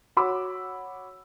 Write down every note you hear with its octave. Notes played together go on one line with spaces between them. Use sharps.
F#4 C#5 B5 D6 E6